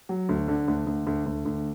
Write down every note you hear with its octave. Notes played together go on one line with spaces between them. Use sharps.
F#3
D2
D3
D2
D2
D2
D2
D2